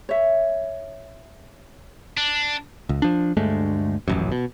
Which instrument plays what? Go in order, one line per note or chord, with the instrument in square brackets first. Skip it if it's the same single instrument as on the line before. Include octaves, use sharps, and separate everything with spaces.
[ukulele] C#5 E5
[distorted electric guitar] D4
[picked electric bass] C#2
F3 D4
D2 G2 G#3 A3
D#1 A1 F#2
B2